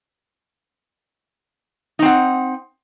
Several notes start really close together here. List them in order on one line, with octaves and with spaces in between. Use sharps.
D#4 C4 F#5